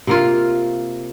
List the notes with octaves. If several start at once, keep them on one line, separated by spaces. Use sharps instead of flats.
C3 A#3 F4